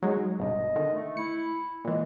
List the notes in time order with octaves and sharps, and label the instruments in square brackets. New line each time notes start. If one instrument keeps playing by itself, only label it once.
[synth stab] F#3 G#3 [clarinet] D#4
[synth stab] G1 G2 B2 [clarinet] D#5
[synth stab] D3 D#3
[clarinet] A3
[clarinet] E4 [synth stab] C#7
[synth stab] A#2 E3 [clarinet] G#3